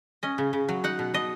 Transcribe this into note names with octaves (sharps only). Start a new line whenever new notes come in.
C#4 D#5
C#3
C#3
F#3
D#4 F#5
B2
B2 D#5